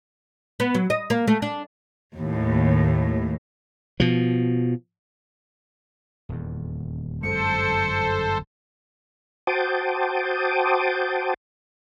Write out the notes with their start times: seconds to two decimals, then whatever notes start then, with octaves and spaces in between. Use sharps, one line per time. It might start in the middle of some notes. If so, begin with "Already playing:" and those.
0.60 B3
0.75 F#3
0.90 D#5
1.10 A#3
1.27 A3
1.42 D4
2.15 D#2 A2
4.00 B2 F3
6.29 D#1 E2
7.23 G1 F#2 G#3 A4 C5 C#7
9.47 F#4 C5 G5 A5 D6 D#6